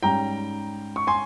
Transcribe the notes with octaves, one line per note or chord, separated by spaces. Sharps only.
G#2 G3 C#4 G5 A#5
C#6
G#5 C6